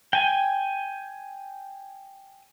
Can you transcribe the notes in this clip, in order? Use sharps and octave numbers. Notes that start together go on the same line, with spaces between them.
G5 G#5